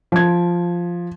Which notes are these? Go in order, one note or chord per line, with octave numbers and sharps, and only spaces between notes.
F3 G#6